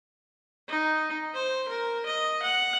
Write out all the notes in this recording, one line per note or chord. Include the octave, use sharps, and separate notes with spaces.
D#4
C5
A#4
D#5
F#5